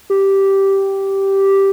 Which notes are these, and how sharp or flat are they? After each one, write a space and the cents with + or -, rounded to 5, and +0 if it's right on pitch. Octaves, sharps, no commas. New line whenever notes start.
G4 -5